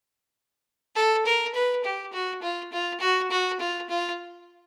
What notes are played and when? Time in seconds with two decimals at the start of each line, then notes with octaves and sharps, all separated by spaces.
0.95 A4
1.26 A#4
1.54 B4
1.84 G4
2.13 F#4
2.42 F4
2.72 F4
3.00 F#4
3.31 F#4
3.60 F4
3.90 F4